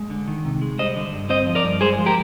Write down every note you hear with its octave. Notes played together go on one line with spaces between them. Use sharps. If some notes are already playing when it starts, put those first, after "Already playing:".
Already playing: G#3
D3
D#3
C3
G#3
G3 C5 D#5
D3
G2
C4 C5 D#5
F3
A#4 D5
G2
G#3 G#4 C5
F3
G4 A#4